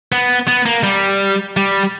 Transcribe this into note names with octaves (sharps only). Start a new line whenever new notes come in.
B3
B3
A#3
G3
G3